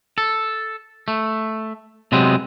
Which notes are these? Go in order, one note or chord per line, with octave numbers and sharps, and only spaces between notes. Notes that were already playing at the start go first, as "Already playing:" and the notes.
A4
A3
C3 F#3 G#3 B3 C4